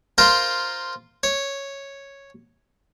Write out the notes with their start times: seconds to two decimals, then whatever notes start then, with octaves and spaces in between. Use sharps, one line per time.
0.18 F4 A#4 C5
1.23 C#5